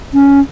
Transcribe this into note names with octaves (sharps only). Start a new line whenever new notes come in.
C#4